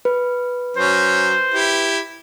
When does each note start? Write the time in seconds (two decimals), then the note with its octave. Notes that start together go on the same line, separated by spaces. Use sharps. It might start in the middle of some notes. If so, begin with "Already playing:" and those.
0.05 B4
0.77 F#3 C#4 C5
1.54 E4 G4